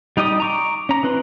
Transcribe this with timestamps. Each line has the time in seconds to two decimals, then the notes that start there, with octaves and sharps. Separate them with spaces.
0.17 G3 D#4 G4 D#5 D#6
0.40 A#5 C#6 D6
0.89 C#4 A#5
1.03 E3 C4 B4 C6